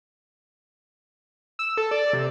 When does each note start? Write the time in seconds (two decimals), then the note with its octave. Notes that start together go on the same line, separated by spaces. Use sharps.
1.59 E6
1.77 A4
1.91 D5
2.13 C3